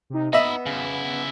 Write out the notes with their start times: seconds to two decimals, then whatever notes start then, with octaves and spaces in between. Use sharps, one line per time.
0.10 C3 D#4
0.33 B3 D#4 D#5 E5 B5
0.66 C#3 E4